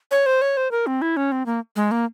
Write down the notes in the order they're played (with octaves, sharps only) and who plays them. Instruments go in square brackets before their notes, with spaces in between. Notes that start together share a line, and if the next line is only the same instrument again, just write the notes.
[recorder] C#5
C5
C#5
C5
A#4
C4
E4
C#4
C4
A#3
G#3
A#3